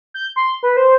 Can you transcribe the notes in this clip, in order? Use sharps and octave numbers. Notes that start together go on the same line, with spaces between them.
G6
C6
B4
C5